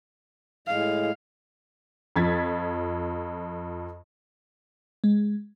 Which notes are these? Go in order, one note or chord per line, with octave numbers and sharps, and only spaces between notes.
A2 G#3 F5
F2 F3 G#6 A6 B6
G#3